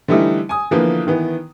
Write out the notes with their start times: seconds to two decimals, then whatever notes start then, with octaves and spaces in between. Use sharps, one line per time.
0.08 D3 E3 G3 A3 D#4 E4
0.49 G#5 D#6
0.71 D3 E3 F3 A#3 B3
1.07 D#3 E3 B3